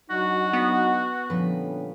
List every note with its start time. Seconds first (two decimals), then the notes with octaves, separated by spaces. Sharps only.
0.10 F#3 D4 D#4 F#4
0.53 B3
1.30 A#2 D3 F3 G3 C#4 B4